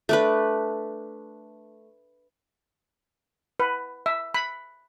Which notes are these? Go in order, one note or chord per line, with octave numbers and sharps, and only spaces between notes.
A3 D4 B4
B4
E5
B5